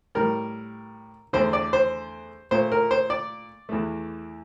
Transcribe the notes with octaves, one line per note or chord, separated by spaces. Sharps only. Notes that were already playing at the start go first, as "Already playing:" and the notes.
A2 G3 A#4
E2 D3 A3 C5
D5
C5
A#2 A3 C5
A#4
C5
D5
E2 E3 A3